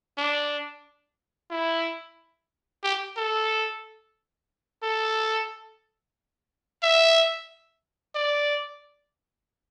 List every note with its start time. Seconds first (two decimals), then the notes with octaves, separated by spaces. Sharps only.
0.18 D4
1.51 E4
2.84 G4
3.17 A4
4.83 A4
6.83 E5
8.15 D5